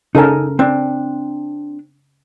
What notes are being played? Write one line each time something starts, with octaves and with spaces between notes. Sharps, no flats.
C#3 D#4 A4 A#4 G#5
C4 D4